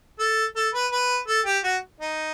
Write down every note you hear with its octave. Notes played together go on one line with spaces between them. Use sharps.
A4
A4
B4
B4
A4
G4
F#4
D#4